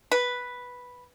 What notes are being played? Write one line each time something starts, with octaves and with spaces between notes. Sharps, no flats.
B4